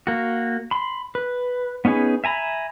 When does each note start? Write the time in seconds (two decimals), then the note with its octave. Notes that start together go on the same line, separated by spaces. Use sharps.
0.07 A#3 F#4
0.71 B5 C6
1.15 B4
1.85 B3 C#4 D#4 G#4 B4
2.24 E5 G#5 A#5 B5